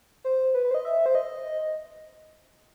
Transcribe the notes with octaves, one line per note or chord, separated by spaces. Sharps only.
C5
B4
B4
C5
D#5
E5
C5
D#5